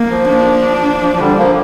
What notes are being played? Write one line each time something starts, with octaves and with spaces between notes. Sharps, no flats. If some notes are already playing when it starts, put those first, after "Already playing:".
Already playing: A#3
F3
D4
F3
F3
D3 G3
F3 A#3